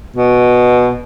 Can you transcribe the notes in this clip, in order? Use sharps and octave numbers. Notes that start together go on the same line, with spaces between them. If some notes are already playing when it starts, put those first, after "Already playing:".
B2